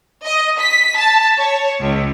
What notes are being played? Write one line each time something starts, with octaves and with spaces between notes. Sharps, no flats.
D#5
B6
A5
C#5
C#2